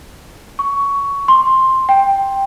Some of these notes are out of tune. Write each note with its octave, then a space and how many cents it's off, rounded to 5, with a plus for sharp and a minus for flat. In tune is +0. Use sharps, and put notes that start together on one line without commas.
C#6 +15
C6 +10
G5 +5